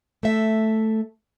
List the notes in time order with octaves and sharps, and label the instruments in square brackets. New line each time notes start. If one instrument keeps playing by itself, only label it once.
[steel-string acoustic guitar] A3 A4 E5